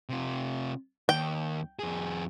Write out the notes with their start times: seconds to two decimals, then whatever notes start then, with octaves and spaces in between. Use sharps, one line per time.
0.09 C3 F4
1.09 D#2 G5
1.79 F2 G#4